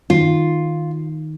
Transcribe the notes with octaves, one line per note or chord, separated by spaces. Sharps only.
D#3 F4